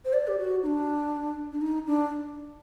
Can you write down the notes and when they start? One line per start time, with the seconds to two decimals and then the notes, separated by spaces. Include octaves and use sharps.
0.05 C5
0.13 D5
0.27 G4
0.38 F#4
0.63 D#4
0.66 D4
1.53 D4
1.61 D#4
1.87 D4